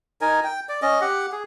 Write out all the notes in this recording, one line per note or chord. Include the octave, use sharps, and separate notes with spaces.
D#4 A#4 G#5
G5
D5
C#4 D#5
G4 F#5
G#4